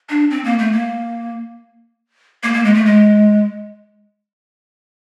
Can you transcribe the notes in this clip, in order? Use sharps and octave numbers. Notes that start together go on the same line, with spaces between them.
D4
C4
A#3
A3
A#3
A#3
A#3
G#3
A3
G#3